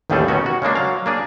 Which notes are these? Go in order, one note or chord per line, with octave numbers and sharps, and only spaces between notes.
A1 D#2 A2 G3 G#4 A4
B2 D#3 C#4 F#4
F#4
C#3 G#3 A#3 D4
F#3 F5
A#3 D4 G#4